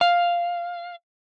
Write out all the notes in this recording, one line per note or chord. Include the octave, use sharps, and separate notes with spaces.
F5